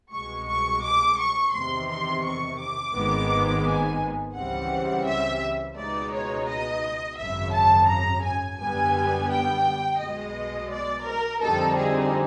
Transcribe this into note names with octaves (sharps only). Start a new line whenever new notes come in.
C2 B2 G#3 C#6
C#6
D6
C#6
E2 C3 D#3 C6
C6
C#6
D6
G#1 G#2 D#3 G#3 B3
G#5
C#2 C#3 E3 G3 C4 F#5
E5
C#2 B2 G#3 B3 D#4 D5
C#5
D#5
G#1 F#2 C#3 E5
A5
A#5
G#5
F#2 D3 G3 B3 G#5
G5
B1 B2 G#3 D#5
D5
A#4
F2 D3 G3 C4 D#4 A4
G#4